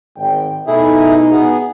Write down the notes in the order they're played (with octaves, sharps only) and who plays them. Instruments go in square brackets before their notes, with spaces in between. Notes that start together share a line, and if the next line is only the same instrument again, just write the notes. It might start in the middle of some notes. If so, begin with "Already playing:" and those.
[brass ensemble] G#1 G5
[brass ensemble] B2 D#4 [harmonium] A3 E4 G#4
[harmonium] B3 G#4